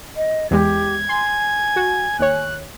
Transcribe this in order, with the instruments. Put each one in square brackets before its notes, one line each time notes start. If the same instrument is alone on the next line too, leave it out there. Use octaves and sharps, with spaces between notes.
[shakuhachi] D#5
[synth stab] E2 G#3 [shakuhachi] G4 [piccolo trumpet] G#6
[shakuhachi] G#5 [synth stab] C6
[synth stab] F#4
[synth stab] D#2 C#5 [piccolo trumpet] F#6